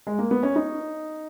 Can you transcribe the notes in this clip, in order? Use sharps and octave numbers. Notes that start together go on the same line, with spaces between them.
G#3
A#3
B3
C#4
D#4